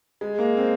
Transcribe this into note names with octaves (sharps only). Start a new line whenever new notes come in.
G#3
A#3
C4